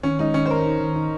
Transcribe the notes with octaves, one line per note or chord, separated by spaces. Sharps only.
D#3 C#4
G#3 D#4
D#3 C#4
C5
D#3 A#4
D#4
D#3
D#4